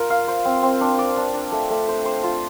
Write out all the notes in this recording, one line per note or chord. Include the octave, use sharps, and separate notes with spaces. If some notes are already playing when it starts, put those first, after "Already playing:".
Already playing: F4 A#4
F5
C5
C4
C4
D4
D5
D4
D4
A3
A3
C5
C5
F4